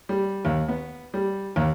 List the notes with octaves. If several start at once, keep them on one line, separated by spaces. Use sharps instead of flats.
G3
D#2
B3
G3
D#2